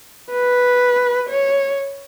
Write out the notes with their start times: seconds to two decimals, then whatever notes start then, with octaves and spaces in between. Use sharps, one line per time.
0.32 B4
1.29 C#5